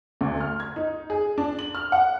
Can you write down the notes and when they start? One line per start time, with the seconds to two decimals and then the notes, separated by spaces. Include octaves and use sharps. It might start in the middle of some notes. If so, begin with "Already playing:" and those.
0.21 D2
0.40 F6
0.60 G#6
0.76 D#4
1.10 G#4
1.38 D4
1.59 F#7
1.75 F6
1.92 F#5